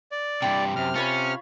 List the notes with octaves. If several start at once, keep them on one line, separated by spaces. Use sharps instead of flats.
D5
G2 C3 E4 G4
F#2 C3 F6
C#4 F4 C#5 B5